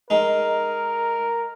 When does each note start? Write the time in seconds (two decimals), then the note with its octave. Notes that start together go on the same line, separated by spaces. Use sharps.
0.10 G#3 D#4 A#4